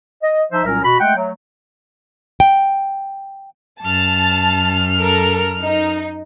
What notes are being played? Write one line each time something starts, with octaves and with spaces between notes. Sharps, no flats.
D#5
F3 D#4 C5 E5
C2 A#2 F#3 C#4 A#4
B2 F#4 B5
G#3 A3 F#5 G5
F#3 A3
G5
F#2 A5 F6
A4 A#4
D#4